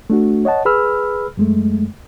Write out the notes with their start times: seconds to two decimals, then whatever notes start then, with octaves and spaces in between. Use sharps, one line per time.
0.10 A3 D4 F#4
0.45 C#5 D#5 F#5 A5
0.65 G#4 B4 B5 E6 F6
1.37 F#2 G#3 A3